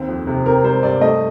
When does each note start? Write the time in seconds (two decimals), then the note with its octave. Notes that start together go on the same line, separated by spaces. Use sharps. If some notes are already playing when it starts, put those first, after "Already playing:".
Already playing: D#2 C4
0.09 F2
0.27 C3
0.46 C4 A#4
0.64 G3 C5
0.83 G2 D5
1.01 A3 D#5